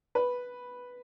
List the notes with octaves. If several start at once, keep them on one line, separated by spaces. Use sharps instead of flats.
B4